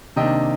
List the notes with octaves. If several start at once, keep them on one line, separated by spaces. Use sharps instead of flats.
C3 D#3 A#3 D4 D#5 G5